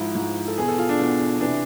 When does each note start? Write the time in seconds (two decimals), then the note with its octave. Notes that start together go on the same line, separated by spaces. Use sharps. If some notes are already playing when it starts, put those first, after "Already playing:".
Already playing: G#2 F3 E4
0.15 G#2 F3
0.48 A4
0.58 E2 B2 G#4
0.68 A4
0.78 F4
0.89 D4
0.99 E2 B2
1.41 C3 E3 D4